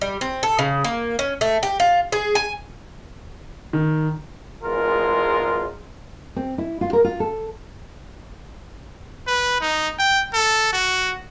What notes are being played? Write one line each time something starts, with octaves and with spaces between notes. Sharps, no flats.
G3
C4
A4
C#3
A#3
C#4
A3
G4
F4
G#4
G#5
D#3
G#1 E2 G#3 F4 A#4
C4
E4
F4
A#4
F4
A4
B4
D#4
G5
A4
F#4